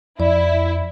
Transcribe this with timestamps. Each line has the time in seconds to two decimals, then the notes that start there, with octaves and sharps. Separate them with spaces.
0.20 F2 E4 D5